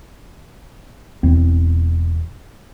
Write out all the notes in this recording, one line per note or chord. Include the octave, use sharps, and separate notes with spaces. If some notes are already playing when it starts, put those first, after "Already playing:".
E1 E2 C4